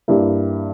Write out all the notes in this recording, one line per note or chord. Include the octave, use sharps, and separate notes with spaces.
G2 G3 A#3 E4